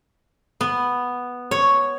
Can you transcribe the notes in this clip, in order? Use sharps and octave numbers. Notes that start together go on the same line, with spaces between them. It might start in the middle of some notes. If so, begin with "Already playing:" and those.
B3
C#5